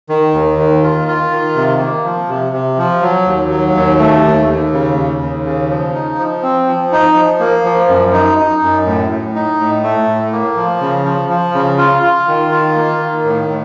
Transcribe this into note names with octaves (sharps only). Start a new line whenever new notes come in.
D#3
D#2
D#3
F4
F4
D#3
C3
A#3
F3
C3
C3
F3
F#3
D#2
F#3
D#2
A3
D#2
D#2
C#3
D#2
D#2
C#3
F3
D#4
F3
C4
F3
D#4
F3
A#3
F3
F#2
D#4
D#4
F#2
A2
A2
D#4
A2
A3
A2
A#3
F3
C#3
F3
F3
C#3
F4
F4
D#3
F4
A#3
D#3
A2
A2